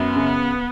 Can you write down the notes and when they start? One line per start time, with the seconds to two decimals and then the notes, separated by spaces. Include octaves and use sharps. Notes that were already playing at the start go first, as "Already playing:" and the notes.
Already playing: F#2 B3
0.16 C#3